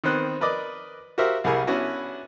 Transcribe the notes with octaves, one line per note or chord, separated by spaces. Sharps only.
D#3 B3 C4 C5 F#6
A#4 B4 D5 D#5 D6 D#6
F#4 G4 A#4 C5 E5 F5
C2 G3 E4 G#4 A#4 G#5
B3 C#4 D4 E4 F#4 B4